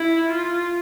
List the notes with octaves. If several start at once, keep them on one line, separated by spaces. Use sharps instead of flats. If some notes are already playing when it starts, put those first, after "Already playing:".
Already playing: E4
F4